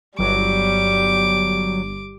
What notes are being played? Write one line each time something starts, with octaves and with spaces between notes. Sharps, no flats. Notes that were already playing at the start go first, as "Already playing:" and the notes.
G1 F#3 G3 D6